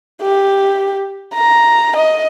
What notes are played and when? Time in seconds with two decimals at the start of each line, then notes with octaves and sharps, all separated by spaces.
0.22 G4
1.34 A#5
1.97 D#5